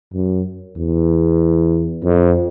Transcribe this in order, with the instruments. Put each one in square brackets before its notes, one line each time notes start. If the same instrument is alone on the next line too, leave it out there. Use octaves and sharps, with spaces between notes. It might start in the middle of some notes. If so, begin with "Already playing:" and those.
[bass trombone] F#2
E2
F2